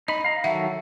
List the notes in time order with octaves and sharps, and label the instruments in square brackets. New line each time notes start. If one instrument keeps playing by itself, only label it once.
[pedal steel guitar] D#4 B5 [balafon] D#5
[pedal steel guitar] F5 A#5
[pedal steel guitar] D#3 F#3 A4 [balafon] E5 F#5